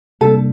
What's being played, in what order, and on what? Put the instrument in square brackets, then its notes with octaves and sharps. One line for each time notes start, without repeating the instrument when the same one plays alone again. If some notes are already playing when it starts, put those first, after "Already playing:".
[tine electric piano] C3 G3 A#3 D4 [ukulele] A4